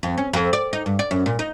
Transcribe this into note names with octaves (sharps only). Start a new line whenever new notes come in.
F2
C#4
F2
D5
D#4
G2
D5
F#2
A#2
D#4